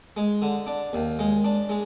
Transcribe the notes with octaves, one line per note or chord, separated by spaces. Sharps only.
G#3
D3
D4
D#2
G#3
D4
G#3